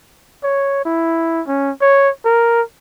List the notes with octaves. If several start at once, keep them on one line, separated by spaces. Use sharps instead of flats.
C#5
E4
C#4
C#5
A#4